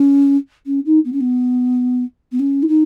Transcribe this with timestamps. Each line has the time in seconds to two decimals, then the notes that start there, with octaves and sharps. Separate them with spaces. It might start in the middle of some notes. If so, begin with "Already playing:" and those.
Already playing: C#4
0.66 C#4
0.85 D#4
1.04 B3
1.12 C#4
1.20 B3
2.31 B3
2.39 C#4
2.62 E4
2.67 D#4